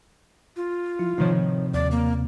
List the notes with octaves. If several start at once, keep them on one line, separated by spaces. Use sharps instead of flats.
F4
F3 E4
A2 C3 D#3 F3 D#4 C5 C#5
D#2 D5
A#3